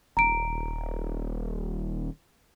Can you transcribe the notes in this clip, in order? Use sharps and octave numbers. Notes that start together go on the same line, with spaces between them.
D#1 A#5 D7